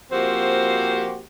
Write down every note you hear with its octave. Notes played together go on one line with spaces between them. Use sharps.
F3 A#3 C4 F#4 G4 C5